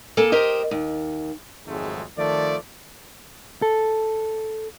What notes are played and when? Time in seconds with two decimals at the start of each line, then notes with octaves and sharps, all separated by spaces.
0.17 A#3 A4 G#5
0.32 G4 A#4 C5 D#5
0.71 D#2
1.67 G#1 F2 G#2 F#3 G#3 A3
2.18 D#3 F3 A3 D5
3.62 A4